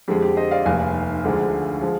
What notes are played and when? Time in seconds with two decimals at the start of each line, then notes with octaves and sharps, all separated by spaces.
0.08 F2 D3 F3 G#3 G4
0.22 G4
0.37 C5 D#5
0.51 D5 F5
0.66 F1 D#2 D#3 F5 G#5
1.24 D2 D3 F3 G#3
1.82 F3 G#3